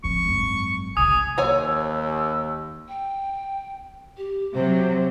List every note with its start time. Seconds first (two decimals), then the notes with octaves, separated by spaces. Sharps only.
0.04 F3 C4 C#6
0.25 G#1 F#2
0.97 C2 G#5 D#6
1.38 D#2 C#5 G#5 A#5 E6
2.88 G5
4.17 G4
4.55 C3 F#3 C5